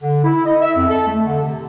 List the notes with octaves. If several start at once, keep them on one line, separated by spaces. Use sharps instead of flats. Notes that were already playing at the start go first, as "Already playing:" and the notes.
D3
E4
D#5
E5
F2
A4
A3
D3
C3